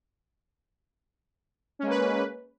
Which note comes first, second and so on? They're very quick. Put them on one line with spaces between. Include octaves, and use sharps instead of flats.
C#4 G#3 A#3 B4